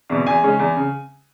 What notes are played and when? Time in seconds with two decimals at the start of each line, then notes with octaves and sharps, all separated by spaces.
0.10 E2 B2
0.26 E2 G#5
0.43 C#3 G#3 C#4
0.59 E2
0.76 C#3